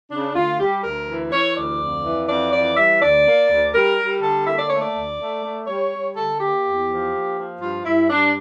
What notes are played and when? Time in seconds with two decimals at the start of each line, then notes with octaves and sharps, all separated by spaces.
0.11 C#3 D4
0.35 D2 F4
0.60 G3 G4
0.83 D2 A#4
1.08 E3
1.32 E3 C#5
1.57 D2 D5
1.80 F2
2.05 E3
2.29 F2 D5
2.53 E3 D5
2.77 G3 E5
3.02 D2 D5
3.25 A#3
3.50 D2
3.74 G3 A#4
3.99 G3
4.22 D3 A4
4.46 A#3 E5
4.59 D5
4.70 A3 C#5
4.82 D5
4.95 D2
5.19 A3
5.43 A3
5.67 G3 C#5
5.92 G3
6.16 D3 A4
6.40 A#3 G4
6.64 E2
6.88 F3
7.13 A#3
7.37 F3
7.61 G2 F4
7.85 G2 E4
8.09 G2 D4